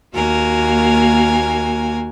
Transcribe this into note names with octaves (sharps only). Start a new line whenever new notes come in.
D#2 A#3 F#4 A#4 G#5